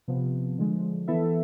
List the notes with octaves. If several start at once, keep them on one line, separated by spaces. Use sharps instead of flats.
C3 F3 B3
D3 F3 G#3
E3 B3 E4 A4 E5